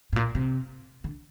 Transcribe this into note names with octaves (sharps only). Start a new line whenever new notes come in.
A2
A#2
C3
D3